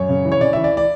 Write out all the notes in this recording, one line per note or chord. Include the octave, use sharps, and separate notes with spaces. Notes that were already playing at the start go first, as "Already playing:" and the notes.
Already playing: F#2 C#5
C#3
E3
C#5
C#3 D5
E3 E5
D5
D5